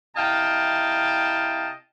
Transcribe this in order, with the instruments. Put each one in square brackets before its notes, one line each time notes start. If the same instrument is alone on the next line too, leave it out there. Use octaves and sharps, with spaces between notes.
[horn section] C3 E4 D#5 F5 G5 A5